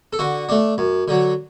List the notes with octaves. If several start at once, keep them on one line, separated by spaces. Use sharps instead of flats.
A4
D3 F#4
A3 D4
F#2
D3 F#3